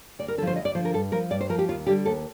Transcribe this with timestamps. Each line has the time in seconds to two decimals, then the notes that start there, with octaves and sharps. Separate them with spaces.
0.19 D2 D5
0.28 A#4
0.38 D3 A4
0.42 F3
0.47 C5
0.56 D2 D#5
0.65 D5
0.75 D3 F3 C5
0.85 A#4
0.94 G2 A4
1.12 F3 A#4
1.30 G2 D5
1.41 C5
1.49 F3 A#4
1.59 G4
1.68 D#2 F4
1.87 D3 G3 G4
2.05 D#2 A4